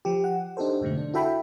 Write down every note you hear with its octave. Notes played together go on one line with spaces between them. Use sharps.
F3 G4
F#5
D4 D#4 G4 A4 C5
F2 G#2 B2 D3 A3
D4
E4 F#4 A4 E5 G5 B5